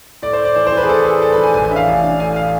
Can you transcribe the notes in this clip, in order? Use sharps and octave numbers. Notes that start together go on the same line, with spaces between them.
A2 D5
C5
A3
D5
E3 C5
C5
E3 B4
G#4
A2 A4
A3 G#4
A3 A4
B4
E3
G#5
A1 G#5
G#5
D4 E5
F5
A1
D4
A2 G#5
F5